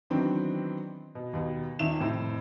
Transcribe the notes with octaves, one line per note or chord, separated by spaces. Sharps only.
D#3 E3 F#3 B3 C4 D4
B2
D#2 B2
D#1 D#3 E5 E7
F1 A2 C4